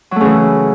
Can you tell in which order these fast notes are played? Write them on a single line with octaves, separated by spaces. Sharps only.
F#3 A3 C#3 E3